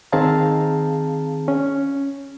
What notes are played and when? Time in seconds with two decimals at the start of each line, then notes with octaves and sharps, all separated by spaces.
0.12 D#3 C4 G#4 F5 A5 A#5
1.48 C#4